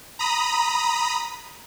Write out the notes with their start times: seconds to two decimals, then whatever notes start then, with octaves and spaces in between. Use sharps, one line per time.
0.19 A#5 B5 D#6